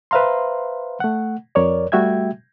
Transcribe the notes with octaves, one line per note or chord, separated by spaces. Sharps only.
B4 C5 E5 F5 A#5 C6
A3 F#5
F2 A#4 C#5 D5
G3 A3 F#4 E5 G5 G#6